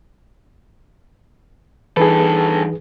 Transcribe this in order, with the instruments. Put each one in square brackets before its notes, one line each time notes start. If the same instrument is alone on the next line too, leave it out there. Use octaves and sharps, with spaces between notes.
[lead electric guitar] G2 A4 [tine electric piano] E3 D#4 [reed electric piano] G#4 B4